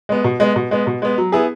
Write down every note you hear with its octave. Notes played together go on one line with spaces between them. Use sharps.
G#3 B3
B2
G#3 B3
B2
G#3 B3
B2
G#3 B3
F#3
B3 E4 G#4